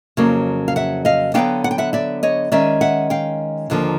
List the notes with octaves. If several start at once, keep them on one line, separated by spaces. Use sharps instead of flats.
F2 C#3 F#3 A#3
F5
E5 F#5
D#5 F5
D3 F#3 B3 D4 F5 G5
F#5
G5
E5 F#5
D5 E5
C#5 D#5
D#3 G#3 C#4 D5 E5
E5 F#5
F5 G5
D#2 D3 F3 A#3